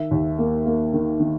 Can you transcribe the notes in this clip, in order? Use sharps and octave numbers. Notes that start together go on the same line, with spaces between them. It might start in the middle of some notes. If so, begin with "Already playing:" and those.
Already playing: D#3 E5
D#2
A#3
A#3
D#3
D#3